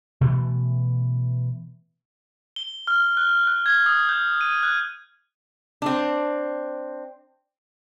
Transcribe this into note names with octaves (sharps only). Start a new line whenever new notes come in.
B2 E3 A3 B3
G7
F6
F#6
F#6
G#6
D#6
G6
D#7
F#6
C4 D4